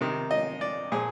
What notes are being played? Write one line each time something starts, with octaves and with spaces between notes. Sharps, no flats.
C3 D#3
D#5
D5
A#2 F3 G#4